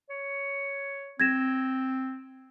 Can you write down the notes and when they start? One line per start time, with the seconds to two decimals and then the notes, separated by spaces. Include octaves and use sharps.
0.10 C#5
1.20 C4 G#6 A#6 E7